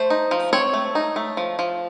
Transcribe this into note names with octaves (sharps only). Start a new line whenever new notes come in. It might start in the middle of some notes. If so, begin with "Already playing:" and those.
Already playing: A3 C5
D#4
F3
C4 C#5
A3
D#4
A3
F3
F3